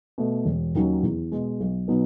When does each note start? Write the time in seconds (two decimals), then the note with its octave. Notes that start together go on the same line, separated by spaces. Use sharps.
0.18 B2 A3
0.46 E1
0.75 D#2 D#3 F#3 C#4
1.03 E2
1.32 B2 G#3
1.60 B1
1.88 B2 F#3 B3 D#4